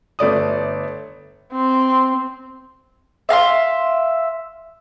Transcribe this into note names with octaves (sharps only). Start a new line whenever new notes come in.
G1 A3 D5 D#6
C4
E5 F5 A#5 C6